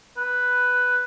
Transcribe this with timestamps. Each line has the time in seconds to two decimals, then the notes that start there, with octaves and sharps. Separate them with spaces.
0.17 B4